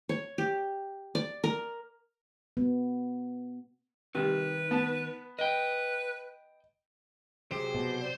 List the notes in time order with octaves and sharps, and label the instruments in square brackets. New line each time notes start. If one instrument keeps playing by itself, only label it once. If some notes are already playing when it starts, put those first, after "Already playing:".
[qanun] C#5
G4
D5
A#4
[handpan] B3
[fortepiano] C3 G3 [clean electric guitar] D#3 [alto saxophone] B4
[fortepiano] B3 A5
[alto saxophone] B4 [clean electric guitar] D#5 G5
[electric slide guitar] C3 F#3 G4 [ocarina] G#4 [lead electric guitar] C5
[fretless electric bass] B2
[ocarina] D5